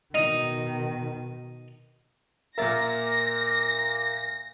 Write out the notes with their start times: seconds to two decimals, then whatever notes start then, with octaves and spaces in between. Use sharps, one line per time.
0.14 B2 D#3 D#4
2.58 A#2 A#3 A#4 E5 A6 A#6